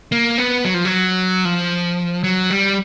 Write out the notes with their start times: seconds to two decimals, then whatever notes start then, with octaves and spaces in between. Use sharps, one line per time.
0.12 A#3
0.38 B3
0.65 F#3
0.74 F3
0.85 F#3
1.45 F3
2.24 F#3
2.50 G3